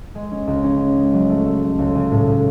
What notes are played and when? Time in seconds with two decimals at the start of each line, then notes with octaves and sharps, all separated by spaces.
0.15 G#3
0.31 C#4
0.47 C#2
0.64 C#4
0.81 C#4
0.97 G#3
1.13 F#3
1.29 A3
1.46 A3
1.62 A3
1.79 C#2
1.95 C#3
2.12 A2
2.27 A2